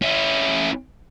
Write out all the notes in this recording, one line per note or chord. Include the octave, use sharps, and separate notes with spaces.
C#4 E4